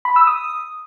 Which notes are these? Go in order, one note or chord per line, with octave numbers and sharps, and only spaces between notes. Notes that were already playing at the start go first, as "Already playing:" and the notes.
B5
E6
D#6